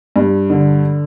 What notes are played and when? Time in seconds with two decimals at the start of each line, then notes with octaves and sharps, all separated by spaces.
0.16 G2
0.50 D3